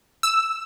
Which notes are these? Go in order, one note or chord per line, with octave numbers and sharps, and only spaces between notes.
E6